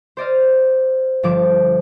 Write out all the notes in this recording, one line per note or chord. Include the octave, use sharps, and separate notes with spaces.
C5 D5 D#5 F6
G1 F3 D6